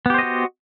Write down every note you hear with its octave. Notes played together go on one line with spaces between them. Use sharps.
B3 F#4 G4 C5 D#5